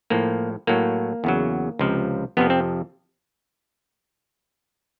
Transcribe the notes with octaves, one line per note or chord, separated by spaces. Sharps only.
A2 F3 A#3
A2 F#3 A#3
E2 C#3 F#3
C#2 C3 F3
F2 C3 F3 B3
C4